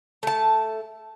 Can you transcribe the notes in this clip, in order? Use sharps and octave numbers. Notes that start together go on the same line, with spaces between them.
A3 A5